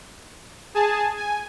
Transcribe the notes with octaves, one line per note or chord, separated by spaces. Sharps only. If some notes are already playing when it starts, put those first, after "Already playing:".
G#4 G#5 A5
G#5